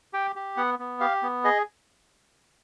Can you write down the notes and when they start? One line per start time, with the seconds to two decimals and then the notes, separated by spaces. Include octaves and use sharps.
0.13 G4 G5
0.36 G4
0.57 B3 F#5
0.79 B3
1.00 G4 F5
1.23 B3
1.44 G#4 D#5